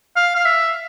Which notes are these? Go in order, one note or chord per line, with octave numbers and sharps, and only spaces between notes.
F5
F5
E5